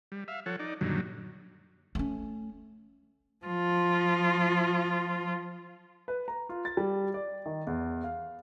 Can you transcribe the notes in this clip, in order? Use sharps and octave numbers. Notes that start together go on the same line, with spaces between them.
G3
E5 F5
F3 A4 C#5 F#5
D#4 D5
F#2 A#2 D3 D#3 F#3 G3
A3 C#4
F3 F4
B4
A#5
F4
A6
G3
D5
D#3
E2
F5